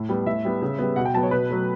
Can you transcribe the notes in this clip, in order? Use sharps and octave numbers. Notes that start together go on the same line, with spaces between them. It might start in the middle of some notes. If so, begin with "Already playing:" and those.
Already playing: A2
G3 B3
A2 E5
G3 B3
C#3
G3 B3
B2 F#5
G5
F#3 B3 A5
C#5
B2 B4
F#3 A3